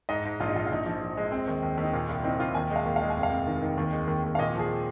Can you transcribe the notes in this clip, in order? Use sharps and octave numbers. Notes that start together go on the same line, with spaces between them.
G#2 D#5
G#2
A#1 F4
D#4
A#1 F4
F4
A#1 D#4
F3
F3
G#3
C4
D#2
D#2
D#2 D#4
A#2 F4
C2 F4
C4 D#4
A#2 F4
D#2 G#5
G#3
F5
D#2
F5
G#3
G#5
F1
F5
F1
D#3
D#3
D#2
G#3
D#2
D#2
F5
A#2 D#5
F3 G#4